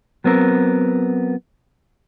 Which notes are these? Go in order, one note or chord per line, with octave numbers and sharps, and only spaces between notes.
F#3 B3 C4 A#4